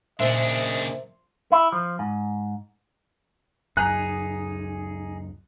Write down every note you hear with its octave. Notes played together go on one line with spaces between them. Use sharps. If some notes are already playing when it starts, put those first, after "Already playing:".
A#2 C#3 D4 C5 D#5 E5
E4
F3
G#2
F#1 C#2 F#2 D#4 G#4 G#5 A#5 F#6